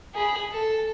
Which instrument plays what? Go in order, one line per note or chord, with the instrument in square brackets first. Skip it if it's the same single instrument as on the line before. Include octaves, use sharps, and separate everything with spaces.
[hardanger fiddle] G#4 B5
A4